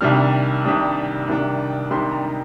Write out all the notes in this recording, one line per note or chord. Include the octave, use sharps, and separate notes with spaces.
C2 C3 D#3 G3 D4 F6
C2 C3 D#3 G3 D4 D#6
C2 C3 D#3 G3 D4
C2 C3 D#3 G3 D4 C6
A#5